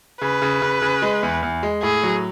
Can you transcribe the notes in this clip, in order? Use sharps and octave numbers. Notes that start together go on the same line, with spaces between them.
C#3 B4
C#3
C#3
C#3
G#3
E2
E2
G#3
A2 G#4
F#3